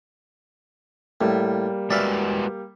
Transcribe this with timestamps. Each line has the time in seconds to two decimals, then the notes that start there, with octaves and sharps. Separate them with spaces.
1.21 A2 G3 A#3
1.90 G#3 F#4 B4 D5 E5 F5